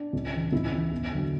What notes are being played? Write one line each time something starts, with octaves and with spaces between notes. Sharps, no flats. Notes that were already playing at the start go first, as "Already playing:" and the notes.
Already playing: D4
C#2
C#3 E3
C#2 E4
C#3 E3
E2
D3 F#3